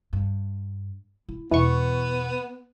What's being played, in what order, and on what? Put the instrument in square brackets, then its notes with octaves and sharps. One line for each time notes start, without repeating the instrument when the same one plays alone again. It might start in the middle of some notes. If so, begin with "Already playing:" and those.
[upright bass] G2
E4
[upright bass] E2 B2 [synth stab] E3 C#6 [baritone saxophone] B3